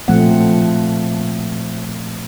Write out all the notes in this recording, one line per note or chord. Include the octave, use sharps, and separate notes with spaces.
A#2 F3 A3 C4 F#5